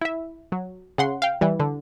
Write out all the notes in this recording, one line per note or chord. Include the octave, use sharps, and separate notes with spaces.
E4 E5
F#3
C#3 F#5 C6
F5 G5
E3 G3
D3